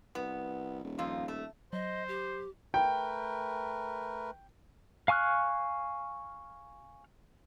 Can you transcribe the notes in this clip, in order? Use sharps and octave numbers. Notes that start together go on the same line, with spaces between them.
C2 B3
D#1
F2 D#4 F4
A3
F#3 C5 D#5
G4
A3 A#4 B4 G5
F5 G#5 C#6 F6 F#6